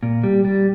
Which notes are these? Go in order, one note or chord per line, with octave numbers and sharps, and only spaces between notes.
A#2
G3
G3